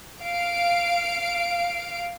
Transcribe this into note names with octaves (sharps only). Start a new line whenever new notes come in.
F5 D7